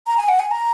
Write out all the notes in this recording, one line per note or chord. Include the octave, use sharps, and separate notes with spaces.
A#5
G#5
F#5
G#5
A#5